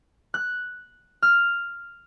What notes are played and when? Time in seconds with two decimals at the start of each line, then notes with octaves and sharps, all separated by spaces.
0.34 F#6
1.22 F6